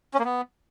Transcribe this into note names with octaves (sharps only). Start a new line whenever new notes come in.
C#4
A#3
B3